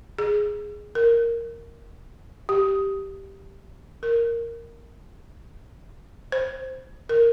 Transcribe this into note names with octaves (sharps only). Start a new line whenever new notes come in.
G#4
A#4
G4
A#4
C5
A#4